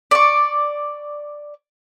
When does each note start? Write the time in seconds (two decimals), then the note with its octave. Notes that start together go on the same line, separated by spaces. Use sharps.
0.11 D5 C#6